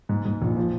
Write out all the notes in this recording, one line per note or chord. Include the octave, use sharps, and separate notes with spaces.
G#2
G#2
A#1
F3